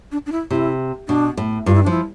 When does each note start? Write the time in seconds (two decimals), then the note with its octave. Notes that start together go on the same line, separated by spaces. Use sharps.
0.12 D4
0.26 D4
0.32 E4
0.50 C3 E4
1.08 B2 D4
1.37 A2
1.66 G2 F4
1.75 E4
1.83 D4
1.86 F3 E4